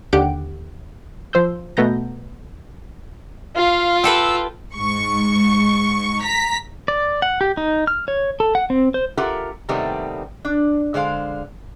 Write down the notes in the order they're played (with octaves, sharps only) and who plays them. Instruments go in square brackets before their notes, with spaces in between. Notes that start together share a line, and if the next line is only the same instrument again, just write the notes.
[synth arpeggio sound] D#2 D3 G4 F#5 D7
F3 C5 E6 G6
B2 A3 B3 A#5 G6 A#6
[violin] F4 [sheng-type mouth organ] F5
[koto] G4 A4 B4 [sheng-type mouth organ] E6
[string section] G#2 C#6
A#5 B6
[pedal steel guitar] D5
F#5
G4
D#4
F6
C#5
A4
F#5
C4
C5
[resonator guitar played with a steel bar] F4 G4 A4 A#4 E5 F#5
C3 D#3 G3 A3 B3 C4
D4
D3 G#3 C5 F5